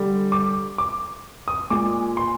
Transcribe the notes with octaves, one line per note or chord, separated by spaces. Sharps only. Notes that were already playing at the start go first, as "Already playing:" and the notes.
Already playing: D3 G3
D6
D6
D#6
A#2 G#3 D6
C6